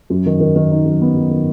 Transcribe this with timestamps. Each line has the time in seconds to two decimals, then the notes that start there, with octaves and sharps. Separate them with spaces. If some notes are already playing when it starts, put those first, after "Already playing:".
0.10 F#2
0.26 D#3
0.40 D#3
0.56 D#3
0.71 D#4
0.85 F#2
1.01 B3
1.17 F#2
1.31 D#3